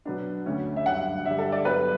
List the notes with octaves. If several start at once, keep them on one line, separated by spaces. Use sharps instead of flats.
B2 F#3 B3 D4
D2 D3 A3 C#4
E5
G2 D3 F#3 F#5
G2 D3 G3 E5
A4
D5
G2 F#3 B3 B4